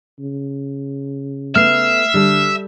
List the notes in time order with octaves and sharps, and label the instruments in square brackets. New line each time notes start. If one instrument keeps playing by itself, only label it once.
[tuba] C#3
[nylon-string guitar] A3 B3 [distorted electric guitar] E5 [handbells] F6 C7
[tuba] D3 [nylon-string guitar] G3 A4